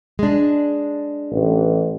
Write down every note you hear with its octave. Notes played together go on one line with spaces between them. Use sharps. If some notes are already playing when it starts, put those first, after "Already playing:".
G#3 D4
A1